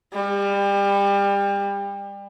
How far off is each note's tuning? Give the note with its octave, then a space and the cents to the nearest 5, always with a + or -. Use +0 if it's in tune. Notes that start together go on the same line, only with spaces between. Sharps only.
G3 +30